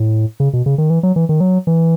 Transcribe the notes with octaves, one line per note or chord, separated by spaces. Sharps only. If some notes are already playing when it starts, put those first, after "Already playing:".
Already playing: A2
C#3
B2
C#3
D#3
E3
F#3
E3
D#3
F#3
E3